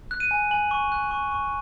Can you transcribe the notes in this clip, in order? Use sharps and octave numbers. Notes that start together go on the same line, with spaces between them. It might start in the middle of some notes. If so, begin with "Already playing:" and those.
F#6
D#7
G#5
G#5 F#7
C#6
F#6
C#6
C#6